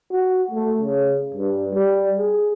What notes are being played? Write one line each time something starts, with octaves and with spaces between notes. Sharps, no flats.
F#4
A3
C#3
G2
G3
G#4